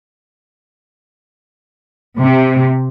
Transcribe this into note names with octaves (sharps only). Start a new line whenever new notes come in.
C3